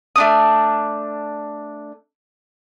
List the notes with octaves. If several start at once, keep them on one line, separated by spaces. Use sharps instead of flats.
A3 D4 D#6